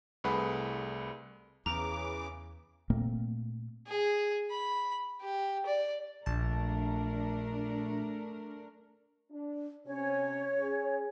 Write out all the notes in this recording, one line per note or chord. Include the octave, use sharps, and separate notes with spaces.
C2 A3 G#4 B4 F#5 B5
E2 C#3 E3 A#5 D6
A#2 A3 A#3 C4
G#4
B5
G4
D5
A#1 A3 D4 A#4 A5
D4
C3 C#4 C#5
C#4 G#4